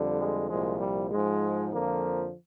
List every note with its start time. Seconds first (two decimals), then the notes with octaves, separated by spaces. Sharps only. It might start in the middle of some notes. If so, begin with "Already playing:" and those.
Already playing: F2 D3 G3
0.19 G#3
0.49 C2 A#2 F3 G#3
0.80 G3
1.11 G#2 F3 G#3
1.71 F2 D3 F3 A#3